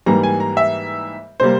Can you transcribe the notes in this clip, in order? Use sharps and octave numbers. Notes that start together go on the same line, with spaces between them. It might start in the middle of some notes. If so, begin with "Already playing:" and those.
G#2 E3 G3 A#3 A#5
G#5
A#5
E5
C3 G3 A#3 C5